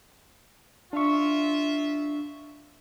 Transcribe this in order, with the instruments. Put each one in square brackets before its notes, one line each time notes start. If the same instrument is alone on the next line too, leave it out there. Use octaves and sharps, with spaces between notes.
[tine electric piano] D4 C#6 [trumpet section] F4 E5